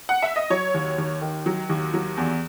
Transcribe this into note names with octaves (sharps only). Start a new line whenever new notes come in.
F#5
E5
D#5
F#3 C#5
D#2
D#2
D#3
F#3
D#2
F#3
E2